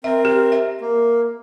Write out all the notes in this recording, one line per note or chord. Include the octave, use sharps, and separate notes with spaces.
C4 A#4 E5
G4
E5
A#3